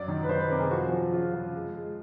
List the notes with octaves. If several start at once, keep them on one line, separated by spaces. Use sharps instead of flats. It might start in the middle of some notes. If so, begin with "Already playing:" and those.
Already playing: F#2 F#3 D5
D#3
B4
D#3 C5
B4
C3 A#4
G#4
F3 F#4
F3
C#3 F4
F3
G#3
G#3